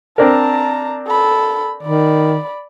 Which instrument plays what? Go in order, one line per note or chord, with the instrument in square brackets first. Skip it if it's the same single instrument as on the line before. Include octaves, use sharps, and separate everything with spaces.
[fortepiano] C4 D4 A#4 [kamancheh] A5 A#5
[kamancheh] A4 B5
[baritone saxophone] D#3 [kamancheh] D5 B5